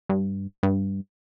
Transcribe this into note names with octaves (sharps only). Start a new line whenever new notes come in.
G2
G2